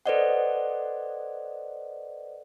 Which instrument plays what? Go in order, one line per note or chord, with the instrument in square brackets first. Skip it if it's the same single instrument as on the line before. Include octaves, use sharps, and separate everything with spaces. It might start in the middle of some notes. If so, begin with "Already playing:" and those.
[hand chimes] A4 B4 C5 D5 D#5 F#5